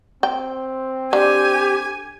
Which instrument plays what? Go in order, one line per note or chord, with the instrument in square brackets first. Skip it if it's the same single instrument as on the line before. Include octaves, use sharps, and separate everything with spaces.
[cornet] C4 [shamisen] G5
[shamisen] D3 [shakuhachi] G4 [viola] G#5